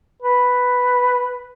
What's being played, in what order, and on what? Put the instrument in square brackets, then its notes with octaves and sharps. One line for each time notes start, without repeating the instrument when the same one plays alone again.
[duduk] B4